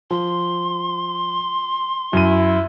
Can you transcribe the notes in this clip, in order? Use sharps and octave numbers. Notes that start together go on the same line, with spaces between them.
F3 C6
F#2 E4 D#7